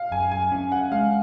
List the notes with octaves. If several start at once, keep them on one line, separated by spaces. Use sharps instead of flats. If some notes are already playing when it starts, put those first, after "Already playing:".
Already playing: F5
F#2 G#5
G#5
C#4
F#5
G#3 F5